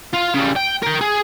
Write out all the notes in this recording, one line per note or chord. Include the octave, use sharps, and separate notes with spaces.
F4
C#3 G3
G5
A#4 G5
G#4